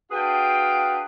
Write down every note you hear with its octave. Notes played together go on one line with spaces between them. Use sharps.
D4 F#4 G#4 B4 F5 G5